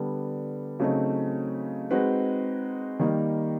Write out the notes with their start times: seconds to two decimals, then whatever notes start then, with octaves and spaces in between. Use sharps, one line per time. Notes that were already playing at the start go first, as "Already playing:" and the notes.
Already playing: D3 G3 B3
0.80 C#3 F#3 A3 C4 D#4
1.91 G#3 C4 D#4 F#4 B4
2.99 D#3 G3 A#3 D#4